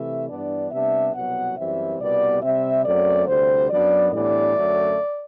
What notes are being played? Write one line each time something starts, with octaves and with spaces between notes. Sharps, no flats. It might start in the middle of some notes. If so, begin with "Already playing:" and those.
Already playing: C3 E3 A3 E5
G2 E3 B3 D4 D5
C3 G3 B3 D4 E5
C2 B2 F#3 B3 F#5
F#2 E3 G3 C4 E5
C2 B2 G3 B3 D5
C3 G3 C4 E5
F#2 F#3 A3 C4 D5
D2 C3 G3 C5
F#2 F#3 B3 D4 D5
A2 E3 G3 B3 D4 D5
F#2 D3 F#3 A3